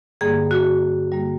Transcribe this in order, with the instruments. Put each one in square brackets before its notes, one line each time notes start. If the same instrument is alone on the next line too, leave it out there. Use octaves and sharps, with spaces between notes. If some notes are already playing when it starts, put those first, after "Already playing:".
[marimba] G2 D3 G3 A#3 G#4
F#4
G2 D3 G3 A#3